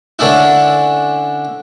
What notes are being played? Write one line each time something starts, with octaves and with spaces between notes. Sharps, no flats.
D3 C#4 D4 E4